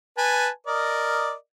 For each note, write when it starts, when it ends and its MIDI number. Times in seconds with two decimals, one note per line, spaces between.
0.18 0.49 71
0.18 0.49 80
0.18 0.49 81
0.67 1.33 70
0.67 1.33 74
0.67 1.33 75